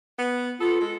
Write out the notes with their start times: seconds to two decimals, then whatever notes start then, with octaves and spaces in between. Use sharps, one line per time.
0.19 B3
0.60 B3 F4 A4
0.80 G#3 A4